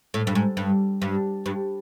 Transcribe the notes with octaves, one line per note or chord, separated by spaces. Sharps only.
A2
G2
G#2
G2
G2
G2